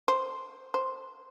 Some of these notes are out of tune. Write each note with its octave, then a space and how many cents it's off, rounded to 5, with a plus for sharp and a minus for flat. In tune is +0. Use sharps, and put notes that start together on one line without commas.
C5 +0
C5 +5